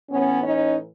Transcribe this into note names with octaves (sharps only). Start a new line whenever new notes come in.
A2 E3 B3 C#4
C#4 D#4